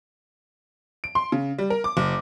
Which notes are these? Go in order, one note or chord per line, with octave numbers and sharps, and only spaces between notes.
D7
C6
C#3
G3
A#4
D6
F#1